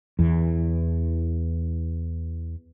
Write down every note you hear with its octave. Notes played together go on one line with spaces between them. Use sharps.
E2 E3